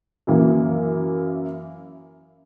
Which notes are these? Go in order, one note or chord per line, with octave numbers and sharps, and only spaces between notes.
F#2 E3 A#3